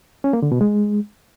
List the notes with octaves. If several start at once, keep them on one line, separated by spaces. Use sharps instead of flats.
C#4
A#3
D3
B2
G#3